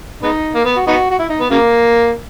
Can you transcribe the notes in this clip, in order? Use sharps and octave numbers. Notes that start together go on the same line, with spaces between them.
G#3 B3 D#4
A#3
B3
F#4
B3 D#4 F#4
F#4
E4
D#4
B3
C#3 F#3 A#3